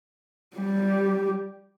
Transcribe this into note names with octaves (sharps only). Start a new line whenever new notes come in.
G3 G4